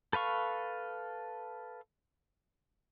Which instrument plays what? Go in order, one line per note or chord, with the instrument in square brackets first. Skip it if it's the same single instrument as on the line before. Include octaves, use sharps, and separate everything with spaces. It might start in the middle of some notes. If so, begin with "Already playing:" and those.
[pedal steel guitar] A4 B4 F5 C#6